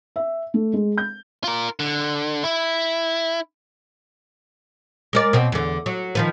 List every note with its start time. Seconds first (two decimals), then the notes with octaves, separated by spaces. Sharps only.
0.16 E5
0.54 A3
0.73 G#3
0.98 G6
1.44 F4 A#4
1.80 D3
2.44 E4
5.13 G#3 A#4 D5
5.33 B2 C4
5.52 E2 D3
5.86 F#3
6.15 D#3 F3 B4